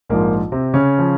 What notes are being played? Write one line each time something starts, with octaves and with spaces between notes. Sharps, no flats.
A#1 G#2 F3 A#3
C3 C4
C#3 C#4
F3